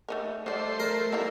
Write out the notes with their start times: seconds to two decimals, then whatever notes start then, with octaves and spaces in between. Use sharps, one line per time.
0.09 A3 D#4 A#4
0.46 D#3 G3 A3 C5 D5
0.80 A#4
1.12 G3 A#3 D#4 E4 A4